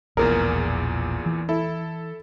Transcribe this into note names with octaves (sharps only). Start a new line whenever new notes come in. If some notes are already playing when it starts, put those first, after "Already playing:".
E1 A#1 E2 A#2 G#4 A#4
E3
E4 A4